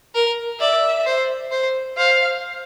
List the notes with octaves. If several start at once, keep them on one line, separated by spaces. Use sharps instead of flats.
A#4
D5 E5
C5
C5
C5 F5